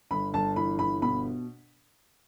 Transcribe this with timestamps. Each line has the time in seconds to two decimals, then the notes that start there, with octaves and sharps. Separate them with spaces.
0.11 G1 B5
0.34 G1 A5
0.56 E3 B5
0.79 G1 B5
1.02 B2 B5